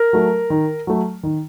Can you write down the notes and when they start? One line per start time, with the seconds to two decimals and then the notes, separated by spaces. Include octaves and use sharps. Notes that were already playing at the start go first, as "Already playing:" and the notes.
Already playing: A#4
0.13 F#3 A3
0.50 D#3
0.87 F#3 A3
1.23 D#3